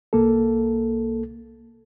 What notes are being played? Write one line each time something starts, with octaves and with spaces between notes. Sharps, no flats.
C2 A#3 A4